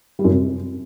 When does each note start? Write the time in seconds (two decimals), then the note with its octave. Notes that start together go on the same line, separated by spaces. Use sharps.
0.19 G3
0.24 F#2
0.30 C3